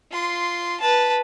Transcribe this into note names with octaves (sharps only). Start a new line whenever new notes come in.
F4 C6
B4 A5